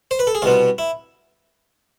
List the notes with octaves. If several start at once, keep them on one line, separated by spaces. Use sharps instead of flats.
C5
B4
A4
G#4
C2 B2 B3 F4
E4